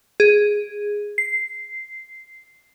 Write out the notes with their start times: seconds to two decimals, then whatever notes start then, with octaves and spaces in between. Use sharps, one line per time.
0.20 G#4
1.18 C7